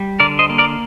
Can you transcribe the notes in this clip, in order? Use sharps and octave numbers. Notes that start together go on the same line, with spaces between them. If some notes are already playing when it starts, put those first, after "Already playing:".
Already playing: G3
D3 A#4 D5
C5 D#5
A#3
A#4 D5